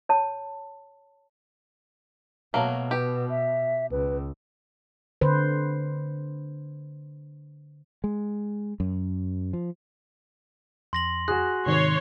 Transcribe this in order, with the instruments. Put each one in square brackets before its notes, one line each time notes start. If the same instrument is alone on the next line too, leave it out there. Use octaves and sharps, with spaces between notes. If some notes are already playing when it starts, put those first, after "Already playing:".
[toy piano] C#5 A5
[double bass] B2 [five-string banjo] F#3 A3 A#3
[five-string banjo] G4 [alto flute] B4
[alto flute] E5
[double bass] C#2 [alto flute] B4
[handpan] D3 B4 C5
[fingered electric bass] G#3
F#2
F3
[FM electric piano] F2 [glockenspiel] C6 A#6 F#7
[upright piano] F#4 G#4 [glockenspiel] F#6
[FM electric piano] G#2 C3 D#3 [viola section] C#5 C6